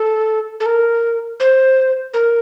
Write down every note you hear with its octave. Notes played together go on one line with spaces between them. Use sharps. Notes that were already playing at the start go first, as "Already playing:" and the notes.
Already playing: A4
A4
A#4
C5
A#4